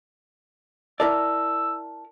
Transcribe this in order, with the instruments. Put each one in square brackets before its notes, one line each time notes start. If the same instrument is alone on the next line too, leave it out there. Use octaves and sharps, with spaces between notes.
[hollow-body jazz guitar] E4 A#4 D5 [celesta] A5 [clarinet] E6